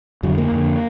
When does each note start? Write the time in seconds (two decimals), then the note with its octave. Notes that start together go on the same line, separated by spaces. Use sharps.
0.23 F2 D3 F#3
0.38 A#3
0.52 F2 D3